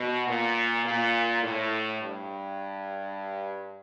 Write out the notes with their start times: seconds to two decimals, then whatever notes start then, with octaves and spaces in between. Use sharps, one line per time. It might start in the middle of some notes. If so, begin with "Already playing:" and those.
Already playing: B2
0.28 A#2
0.85 A#2
1.43 A2
2.01 G2